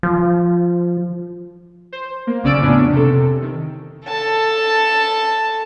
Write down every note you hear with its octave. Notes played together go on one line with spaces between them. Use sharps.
F3
C5
A#3
B1 C#3 C#4 D5 E6 D7
F2 A2 B3 C#4 D4
C3 A4
D#3
A4 A5